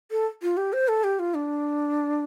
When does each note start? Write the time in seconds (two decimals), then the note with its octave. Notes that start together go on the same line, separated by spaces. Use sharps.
0.11 A4
0.42 F4
0.57 G4
0.73 C5
0.88 A4
1.04 G4
1.19 F4
1.35 D4